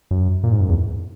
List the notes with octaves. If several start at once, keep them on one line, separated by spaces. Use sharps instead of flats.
F#2
A#2
G#2
F#2
E2